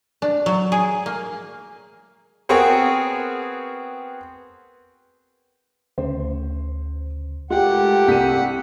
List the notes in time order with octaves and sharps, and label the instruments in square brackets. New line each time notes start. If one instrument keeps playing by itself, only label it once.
[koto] D4
F#3
G#4
A#3
[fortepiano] B3 C4 F#4 G#4 A#4 C#5
[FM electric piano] D2 C#3 [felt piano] C5
[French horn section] A#2 A3 G4 [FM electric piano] G#3 [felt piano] F4 G5 [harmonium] F#5
[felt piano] C2 D#7 [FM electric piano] G5 B6